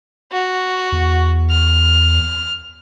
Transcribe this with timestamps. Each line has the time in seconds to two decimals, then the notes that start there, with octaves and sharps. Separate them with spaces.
0.32 F#4
0.92 E2
1.50 F6